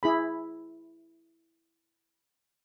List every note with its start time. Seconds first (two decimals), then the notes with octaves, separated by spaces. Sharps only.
0.03 E4 G#4 B5